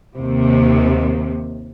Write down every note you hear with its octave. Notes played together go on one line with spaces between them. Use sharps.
D#2 C3